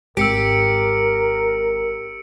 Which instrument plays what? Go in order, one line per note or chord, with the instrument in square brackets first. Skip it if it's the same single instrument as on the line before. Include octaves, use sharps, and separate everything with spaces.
[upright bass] G#1 [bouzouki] G4 [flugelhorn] A#4 [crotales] E6 C#7 D7